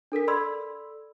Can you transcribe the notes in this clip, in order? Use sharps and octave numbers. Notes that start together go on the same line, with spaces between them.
D4 A4 A#4 B6
A4 D5 B5 C6 E6 G#6